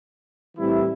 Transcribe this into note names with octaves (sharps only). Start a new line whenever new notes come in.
A2 E3 G3 C4 E4